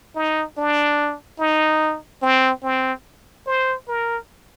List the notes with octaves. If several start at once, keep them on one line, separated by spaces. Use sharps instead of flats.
D#4
D4
D#4
C4
C4
C5
A#4